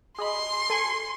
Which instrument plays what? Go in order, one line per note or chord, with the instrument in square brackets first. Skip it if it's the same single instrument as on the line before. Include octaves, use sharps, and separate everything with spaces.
[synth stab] G#4 D#5 B5 [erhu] C6
[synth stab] A4 G#5 C#6